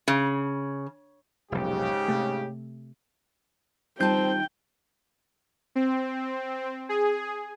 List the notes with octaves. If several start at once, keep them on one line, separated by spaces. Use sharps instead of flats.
C#3
F1 B1 G#2 C#3 G4
C3 A3
G3 C4 D#4 F4 G5 A5 G6
C4
G#4